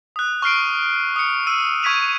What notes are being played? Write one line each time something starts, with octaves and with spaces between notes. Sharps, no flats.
D#6 F#6
C#6 F6 C7 D7
D#6 C#7
E6 D#7
C#6 G#6 B6 D#7 F7